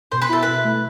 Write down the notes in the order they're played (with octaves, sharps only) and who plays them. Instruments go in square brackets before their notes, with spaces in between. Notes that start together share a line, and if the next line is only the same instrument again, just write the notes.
[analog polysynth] B2 [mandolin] C5
[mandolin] B4
[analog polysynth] E4 [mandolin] A4
[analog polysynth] B2 [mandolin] B4
[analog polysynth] A3